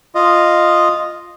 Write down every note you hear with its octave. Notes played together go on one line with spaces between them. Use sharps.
F4 D#5